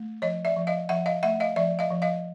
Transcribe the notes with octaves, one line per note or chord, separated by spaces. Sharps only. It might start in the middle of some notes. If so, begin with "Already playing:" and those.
Already playing: A3
F3 C#5 D#5
D5 E5
F3
D#5 F5
F3 E5 F#5
D#5 F5
A3 E5 F#5
D#5 F5
F3 D5 E5
D#5 F5
F3
D#5 F5